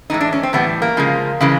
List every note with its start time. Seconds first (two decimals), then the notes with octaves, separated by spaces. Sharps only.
0.10 A2 E3 G#3 D#4
0.21 D4
0.33 C#4
0.43 C4
0.53 A2 E3 G3 B3
0.82 A#3
0.97 C#3 F3 G#3
1.41 C#3 E3 G#3